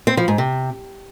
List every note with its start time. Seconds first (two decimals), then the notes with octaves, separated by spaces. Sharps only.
0.07 C4
0.17 F3
0.28 G#2
0.38 C3